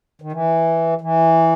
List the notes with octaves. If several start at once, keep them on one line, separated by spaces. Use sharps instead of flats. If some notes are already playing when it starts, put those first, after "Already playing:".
D#3
E3
E3